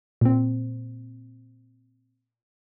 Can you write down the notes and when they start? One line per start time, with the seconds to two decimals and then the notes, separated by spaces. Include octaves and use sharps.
0.21 A#2 C4